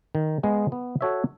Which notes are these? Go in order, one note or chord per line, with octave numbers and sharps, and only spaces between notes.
D#3
G#3 B3
B3
F#4 A4 C#5 E5